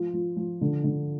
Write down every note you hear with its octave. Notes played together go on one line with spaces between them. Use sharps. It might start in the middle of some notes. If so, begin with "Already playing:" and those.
Already playing: F3 F4
F3
F3
D3
D3